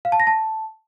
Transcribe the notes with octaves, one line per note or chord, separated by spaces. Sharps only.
F5
A5
A#6
A5